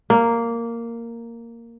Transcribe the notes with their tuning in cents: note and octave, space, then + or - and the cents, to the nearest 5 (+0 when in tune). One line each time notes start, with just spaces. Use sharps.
A#3 -5